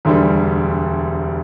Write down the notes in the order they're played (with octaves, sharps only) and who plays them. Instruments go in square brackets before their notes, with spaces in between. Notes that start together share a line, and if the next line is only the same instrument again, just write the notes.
[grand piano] E1 D2 D3 G3